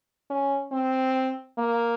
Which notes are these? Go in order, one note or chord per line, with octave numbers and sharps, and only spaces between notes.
C#4
C4
A#3